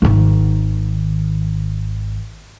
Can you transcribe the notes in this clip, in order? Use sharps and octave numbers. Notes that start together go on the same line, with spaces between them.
G#1 D#3